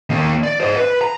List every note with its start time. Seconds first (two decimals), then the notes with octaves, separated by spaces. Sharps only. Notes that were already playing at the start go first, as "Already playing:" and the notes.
0.10 D#3 A#3
0.44 D5
0.61 C5 D#5
0.76 B4
1.01 A#5